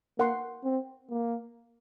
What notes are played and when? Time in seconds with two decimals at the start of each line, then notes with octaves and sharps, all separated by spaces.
0.18 A#3 A#4 F#5 C6
0.64 C4
1.10 A#3